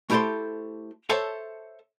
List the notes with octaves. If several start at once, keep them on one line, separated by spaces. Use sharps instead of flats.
A3 E4 G4 A4 C5 C6
A4 C5 C#5 E5 A5